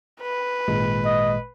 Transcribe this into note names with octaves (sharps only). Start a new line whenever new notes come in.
B4
G#1 A#2 G#3
D#5